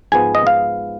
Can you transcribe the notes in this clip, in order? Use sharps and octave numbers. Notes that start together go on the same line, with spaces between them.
G#2 F3 G#3 B3 G#5
D#5
F5